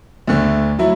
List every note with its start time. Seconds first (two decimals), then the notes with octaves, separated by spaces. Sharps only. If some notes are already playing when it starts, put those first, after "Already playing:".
0.27 D2 D3 A3
0.79 F#3 A3 E4